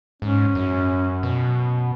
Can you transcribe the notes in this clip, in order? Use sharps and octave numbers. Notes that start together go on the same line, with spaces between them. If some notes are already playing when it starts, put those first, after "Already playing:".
G#2 C#4
F#2
B2